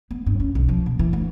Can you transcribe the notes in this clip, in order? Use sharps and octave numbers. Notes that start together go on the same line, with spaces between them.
B3
G2
C#4
B1
F3
A#2
E3
D2